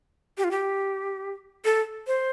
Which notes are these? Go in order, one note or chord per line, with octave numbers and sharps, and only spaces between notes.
G4
F4
G4
A4
C5